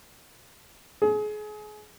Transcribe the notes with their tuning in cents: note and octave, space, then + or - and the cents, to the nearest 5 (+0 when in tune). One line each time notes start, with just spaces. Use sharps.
G#4 +30